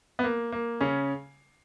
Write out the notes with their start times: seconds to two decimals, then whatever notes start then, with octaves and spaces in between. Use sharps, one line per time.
0.19 B3
0.24 A#3
0.52 A#3
0.81 C#3 C#4